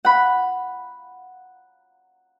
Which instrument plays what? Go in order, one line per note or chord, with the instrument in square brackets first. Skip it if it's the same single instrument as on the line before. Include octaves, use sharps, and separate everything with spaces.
[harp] F#5 B5